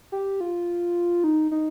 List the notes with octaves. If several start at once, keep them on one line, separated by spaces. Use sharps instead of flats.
G4
F4
D#4
D#4